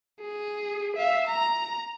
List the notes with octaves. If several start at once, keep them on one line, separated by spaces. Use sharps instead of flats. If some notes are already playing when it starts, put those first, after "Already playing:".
G#4
E5 F5
A#5